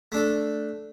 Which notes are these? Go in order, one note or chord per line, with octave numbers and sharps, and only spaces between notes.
A3 D4 A4